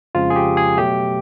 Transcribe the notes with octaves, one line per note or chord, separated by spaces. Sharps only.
F2 C#3 F3 G#3 F4
G#4
G4
G#4
B2 F#3 A3 G4